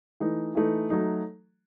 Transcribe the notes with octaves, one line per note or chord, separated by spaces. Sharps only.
E3 A3 D#4
E3 A3 D#4
F#3 A3 D#4